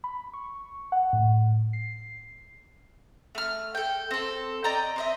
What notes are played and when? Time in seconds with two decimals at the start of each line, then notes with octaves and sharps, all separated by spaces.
0.04 B5
0.33 C#6
0.92 F#5
1.13 A2
1.73 C7
3.35 A3 F6
3.75 A4 G5
4.11 C4 A4
4.64 D5 D#5 G5 A#5
4.96 C4 D#5 E5